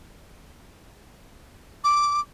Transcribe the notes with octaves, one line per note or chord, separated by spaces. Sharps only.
D6